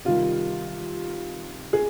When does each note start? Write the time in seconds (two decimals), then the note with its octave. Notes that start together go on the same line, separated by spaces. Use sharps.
0.05 C3 D#3 G3 F4
1.73 G#4